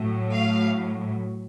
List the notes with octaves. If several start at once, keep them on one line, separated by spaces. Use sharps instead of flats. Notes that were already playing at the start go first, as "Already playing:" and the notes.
Already playing: A2 F#3
F5